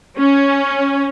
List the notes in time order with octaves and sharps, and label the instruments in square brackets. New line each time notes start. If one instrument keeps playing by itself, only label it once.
[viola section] C#4